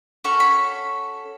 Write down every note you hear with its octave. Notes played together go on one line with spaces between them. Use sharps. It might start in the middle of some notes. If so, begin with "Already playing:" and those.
C#4 F#4 A4 C#6
B5